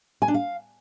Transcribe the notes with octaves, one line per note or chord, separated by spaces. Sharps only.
G#5
D4
F5